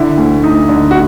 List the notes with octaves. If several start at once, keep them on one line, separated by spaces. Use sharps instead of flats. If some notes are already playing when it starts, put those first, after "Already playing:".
Already playing: D3 E4
D2
D2 D#4
D3
F#4